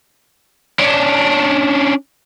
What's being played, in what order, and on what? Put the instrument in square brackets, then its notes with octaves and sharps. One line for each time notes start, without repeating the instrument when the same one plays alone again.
[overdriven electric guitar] C#4 D4